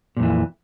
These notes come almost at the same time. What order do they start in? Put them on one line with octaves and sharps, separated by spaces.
A#2 F2 E3